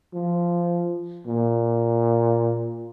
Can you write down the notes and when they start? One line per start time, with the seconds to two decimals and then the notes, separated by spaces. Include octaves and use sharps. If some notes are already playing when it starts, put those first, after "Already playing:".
0.14 F3
1.26 A#2